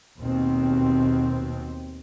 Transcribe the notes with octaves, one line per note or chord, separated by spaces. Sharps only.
D#2 B2 C4